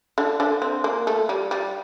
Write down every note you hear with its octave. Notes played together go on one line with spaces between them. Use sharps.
D3 D4
D3 D4
C4
A#3
A3
G3
G3